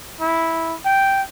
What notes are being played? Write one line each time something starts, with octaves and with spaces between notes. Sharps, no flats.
E4
G5